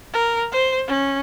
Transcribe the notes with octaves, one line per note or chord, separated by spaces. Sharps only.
A#4
C5
C#4